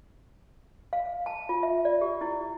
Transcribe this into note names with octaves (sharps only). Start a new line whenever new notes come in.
F5
A5
F4
E5
D5
G4
E4